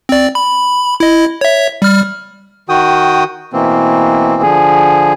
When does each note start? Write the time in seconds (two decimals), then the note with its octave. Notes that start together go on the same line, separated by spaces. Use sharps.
0.09 C4 D5
0.35 B5
1.00 E4 D#5
1.41 C#5 E5
1.82 G3 F6
2.69 D#3 F#4 G5 D#6
3.53 B2 E3 A#3 C4
4.42 D3 F3 G#4